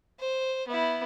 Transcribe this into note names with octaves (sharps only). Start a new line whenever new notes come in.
C5
B3 E4